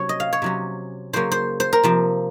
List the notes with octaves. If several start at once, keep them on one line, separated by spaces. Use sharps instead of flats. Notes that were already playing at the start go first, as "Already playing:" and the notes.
Already playing: C3 F#3 C#4 C#5
D#5
F5
C#5
C3 F#3 C#4
C#3 F#3 A#3 C#4 C5
C5
C5
A#4
C3 F3 C4